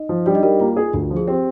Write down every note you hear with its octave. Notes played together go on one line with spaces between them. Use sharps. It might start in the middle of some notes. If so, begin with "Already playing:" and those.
Already playing: D#4 D#5
F3
G3 D4 D5
D#4 D#5
G3 A#4
A#3 F4
G#4
D2
F3
G#4
C4 G4